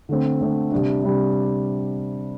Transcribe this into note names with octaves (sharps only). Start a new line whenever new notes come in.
D3 A3 C4
D3 A3 C4
C3 G3 D4
C3 G3 D4